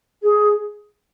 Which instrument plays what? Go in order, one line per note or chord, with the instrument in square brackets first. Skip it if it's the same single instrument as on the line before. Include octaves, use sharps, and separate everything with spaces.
[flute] G#4